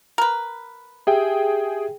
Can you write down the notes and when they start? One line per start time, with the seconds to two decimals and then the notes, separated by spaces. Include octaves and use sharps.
0.18 A#4 B4
1.07 G4 G#4 E5 G5